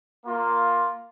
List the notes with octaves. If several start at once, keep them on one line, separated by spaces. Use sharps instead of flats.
A#3 F4